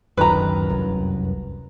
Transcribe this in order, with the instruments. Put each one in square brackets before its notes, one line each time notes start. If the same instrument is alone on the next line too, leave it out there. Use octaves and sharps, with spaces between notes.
[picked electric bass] D1 F#2 D#3 [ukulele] B4 A#5
[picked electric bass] F1 C2 F#2